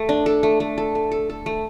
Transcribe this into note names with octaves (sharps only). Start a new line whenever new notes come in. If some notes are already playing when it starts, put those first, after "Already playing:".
Already playing: A3
D4
A4
A3
A3
A4
A3
A4
A4
A3